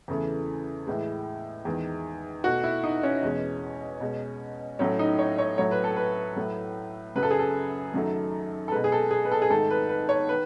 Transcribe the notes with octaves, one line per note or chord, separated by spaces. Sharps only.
E2 C#3 E3 A3
A2 E3 G#3
E2 D#3 G#3
B2 A3 F#4
E4
D#4
C#4
E2 B2 G#3
B2 G#3
A2 F#3 A3 C#4
D#4
C#5
C#5
A2 F#3 A3 C#5
B4
A4
B4
A2 F#3 A3
F#2 C#3 F#3 B4
A4
G#4
A4
F#2 D#3 F#3 A3
A4
B2 G#3 B4
G#4
A4
G#4
B4
A4
G#4
G#2 D#3 A3 A4
B4
B4
C#5
D#3 B4